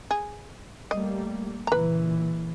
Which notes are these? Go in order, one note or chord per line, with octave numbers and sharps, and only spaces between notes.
G#4
G3 A3 A#3 D#5
A#2 C#3 E3 B4 A#5